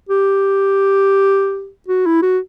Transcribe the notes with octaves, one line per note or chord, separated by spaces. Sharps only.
G4
F#4
E4
F#4